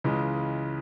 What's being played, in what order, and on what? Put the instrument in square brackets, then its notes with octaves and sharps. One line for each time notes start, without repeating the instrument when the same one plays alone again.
[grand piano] C#2 C#3 E3 G#3